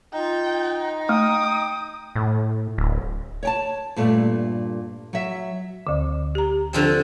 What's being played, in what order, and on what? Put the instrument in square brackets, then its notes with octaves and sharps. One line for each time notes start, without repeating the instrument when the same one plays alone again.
[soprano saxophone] D#4 [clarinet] F4 [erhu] G5
[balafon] A3 [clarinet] G5 [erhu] D#6
[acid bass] A2
D1
[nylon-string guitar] C#5 G5 A5
G2 A#2 A3
F#3 E5
[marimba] D2 D3
G4 A#5
[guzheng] D3 F3 C4